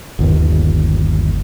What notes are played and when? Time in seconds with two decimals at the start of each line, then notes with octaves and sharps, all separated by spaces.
0.19 G1 D#2